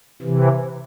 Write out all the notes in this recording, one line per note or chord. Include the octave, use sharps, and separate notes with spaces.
C3 E3